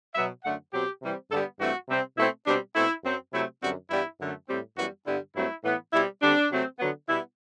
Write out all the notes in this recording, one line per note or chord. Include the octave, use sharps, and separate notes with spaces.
B2 F#3 B3 E5
F#2 D3 A3 F#5
B2 F#3 C4 G4
C3 E3 G3 C4
G2 D3 G3 B3 A4
G2 E3 A3 C4 F#4
C3 G3 C4
B2 A3 C4 E4
B2 G3 C4 D4
B2 A3 C4 E4
F#2 F#3 C4
C3 F#3 A3 C4 E4
F#2 D3 G3 C4 F#4
G2 E3 G3 B3 E4
F#2 D3 A3
A2 G3 C4
F#2 E3 G3 B3 F#4
G2 D3 G3 B3 E4
G2 F#3 A3 C4 E4
A2 E3 B3
B2 G3 C4 E4
D3 G3 C4 D4
C3 F#3 A3 C4
D3 F#3 B3
B2 G3 B3 E4